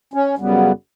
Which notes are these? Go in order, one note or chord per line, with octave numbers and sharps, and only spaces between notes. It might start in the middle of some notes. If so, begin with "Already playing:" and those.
C#4
F#2 C#3 G3 B3